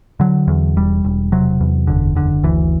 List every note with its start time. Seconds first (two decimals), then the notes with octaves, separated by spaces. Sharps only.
0.20 D3 F#3
0.48 E2
0.76 E1 G3
1.04 E1
1.32 C3 F#3
1.61 E2
1.87 F#1 D3
2.15 F#1 D3
2.43 D2 E3